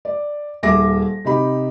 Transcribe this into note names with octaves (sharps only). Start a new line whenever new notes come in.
D5
D#1 A#3 G#4 E5 D6 A#6
C3 D#4 G4 B5